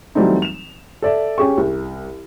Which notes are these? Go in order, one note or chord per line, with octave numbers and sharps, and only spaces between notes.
E3 F#3 G3 A3 C4 D#4
E7 F7
A4 D5 E5
C#4 G4 G#4 C#6
C2